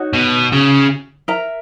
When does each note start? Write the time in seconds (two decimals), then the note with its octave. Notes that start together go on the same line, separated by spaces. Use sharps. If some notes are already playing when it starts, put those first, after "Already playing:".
Already playing: D#4 F#4 C#5
0.13 B2
0.52 C#3
1.28 A#4 E5 A#5